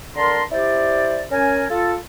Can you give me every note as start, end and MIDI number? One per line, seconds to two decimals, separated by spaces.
0.16 0.42 50
0.16 0.42 70
0.16 0.42 81
0.16 0.42 82
0.16 0.42 84
0.51 1.24 64
0.51 1.24 67
0.51 1.24 72
0.51 1.24 74
1.32 1.65 61
1.32 1.65 70
1.32 1.65 80
1.70 1.95 65
1.70 1.95 69